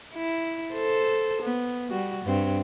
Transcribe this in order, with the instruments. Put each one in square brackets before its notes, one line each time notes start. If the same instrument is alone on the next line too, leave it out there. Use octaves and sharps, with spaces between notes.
[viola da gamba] E4
A4 C5
B3
G3 F#4
G2 C4